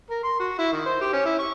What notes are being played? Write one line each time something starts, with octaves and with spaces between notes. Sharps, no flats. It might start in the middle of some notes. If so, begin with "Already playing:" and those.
A#4
C6
F#4
E4
D#3
C5
G4
C#4
E4
C#6